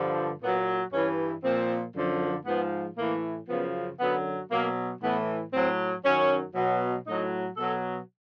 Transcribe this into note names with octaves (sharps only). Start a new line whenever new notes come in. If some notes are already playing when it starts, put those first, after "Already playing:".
Already playing: G2 D3 F3
A#2 F#3 B3
G2 E3 C#4
A#2 F3 C4
F#2 D3 F3
G#2 F3 B3
A2 E3 A#3
F#2 C#3 F3 B3
F#2 D3 F#3 B3
B2 F#3 A#3
A2 E3 B3
A2 F#3 C4
F#2 D#3 F#3 C#4
B2 F#3
A2 F#3 D#4
B2 F#3 A4